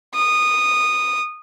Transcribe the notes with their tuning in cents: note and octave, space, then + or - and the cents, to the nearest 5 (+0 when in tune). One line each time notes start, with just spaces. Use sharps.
D#6 -15